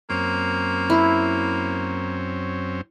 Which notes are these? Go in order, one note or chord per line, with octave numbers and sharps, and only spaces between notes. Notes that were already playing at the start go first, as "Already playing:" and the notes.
F#2 A#3 C4 C#4
E4